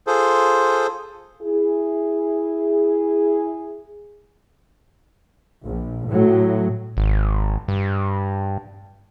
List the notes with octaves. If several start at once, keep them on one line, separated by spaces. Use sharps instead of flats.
F4 G#4 A4 C5
E4 G#4
A#1
A2 F#3
G#1
G2